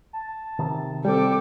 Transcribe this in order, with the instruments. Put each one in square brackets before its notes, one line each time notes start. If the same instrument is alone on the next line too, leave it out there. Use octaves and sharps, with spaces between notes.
[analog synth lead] A5
[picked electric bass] C3 D#3
[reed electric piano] G3 C4 [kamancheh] A4 D6 [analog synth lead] G5